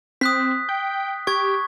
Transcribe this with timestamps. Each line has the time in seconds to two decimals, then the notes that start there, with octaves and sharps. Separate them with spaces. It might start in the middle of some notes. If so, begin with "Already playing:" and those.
0.21 C4 D#6 F#6 B6
0.69 G5
1.27 G4 C#6 G#6